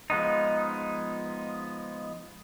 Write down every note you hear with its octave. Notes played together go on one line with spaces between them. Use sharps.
F3 G#3 B3 D#4